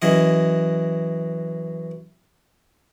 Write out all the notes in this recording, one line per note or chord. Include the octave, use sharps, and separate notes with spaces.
F#2 E3 D#5